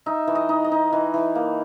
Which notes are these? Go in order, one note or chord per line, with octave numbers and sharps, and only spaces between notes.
D#4 E5
E3
D#5
D#4
D#5
D#4
E3
E3
A#3